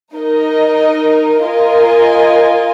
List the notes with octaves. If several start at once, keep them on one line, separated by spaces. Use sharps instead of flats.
D#4 A#4 D#5
F4 A#4 D#5 G#5